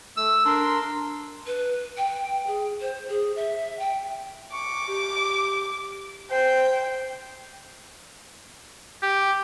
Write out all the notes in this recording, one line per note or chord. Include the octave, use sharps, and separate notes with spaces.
A3 E6
D4 A#4 C6
B4
G5
G#4
C5
G#4
E5
G5
C#6 D6
G4
C5 G5
G4